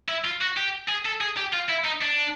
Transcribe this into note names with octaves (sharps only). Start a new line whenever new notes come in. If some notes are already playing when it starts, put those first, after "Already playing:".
E4
F4
F#4
G4
G#4
A4
G#4
G4
F4
E4
D#4
D4